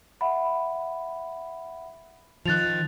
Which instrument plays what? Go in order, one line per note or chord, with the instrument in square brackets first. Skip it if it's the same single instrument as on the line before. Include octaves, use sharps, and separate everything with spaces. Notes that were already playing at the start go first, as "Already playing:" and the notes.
[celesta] E5 F#5 B5
[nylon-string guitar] D#3 F3 [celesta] F#6 A6 F7